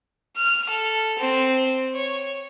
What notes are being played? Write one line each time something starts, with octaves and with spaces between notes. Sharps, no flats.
F6
A4
C4
C#5